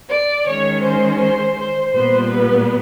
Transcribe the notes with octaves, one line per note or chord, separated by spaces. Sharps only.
D5
D#3 G#3 C#4 C#5
C5
C5
C5
A#2 G3 B3 C5
B4